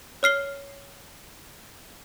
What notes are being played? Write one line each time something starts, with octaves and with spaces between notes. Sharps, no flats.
C#5 F6 C7 G7